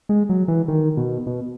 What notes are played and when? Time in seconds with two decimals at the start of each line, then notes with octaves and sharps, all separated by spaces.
0.09 G#3
0.29 F#3
0.48 E3
0.68 D#3
0.97 B2
1.27 B2